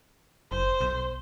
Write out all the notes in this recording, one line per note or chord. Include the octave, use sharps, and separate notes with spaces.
F#1 C5
B1